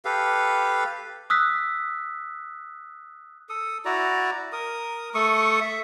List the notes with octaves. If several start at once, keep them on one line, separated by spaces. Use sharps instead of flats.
G4 A4 B4 F5
D#6 E6 F#6 B6
A4 D#6
E4 F#4 D5 A#5
A#4 D#6
A3 A4 C#6 D#6
E5